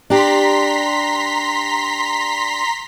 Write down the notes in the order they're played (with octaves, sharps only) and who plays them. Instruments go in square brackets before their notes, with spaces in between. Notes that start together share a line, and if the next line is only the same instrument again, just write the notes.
[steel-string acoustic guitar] D4 G4 [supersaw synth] A#5 C6 B6